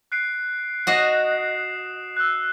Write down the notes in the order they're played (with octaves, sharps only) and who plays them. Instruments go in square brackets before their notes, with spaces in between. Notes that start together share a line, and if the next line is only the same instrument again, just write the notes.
[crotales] F#6 C7 D7
[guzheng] F#4 D#5 [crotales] D#6 C7 E7
[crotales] E6 F#6